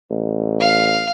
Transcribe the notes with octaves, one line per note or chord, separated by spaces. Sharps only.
A1
F5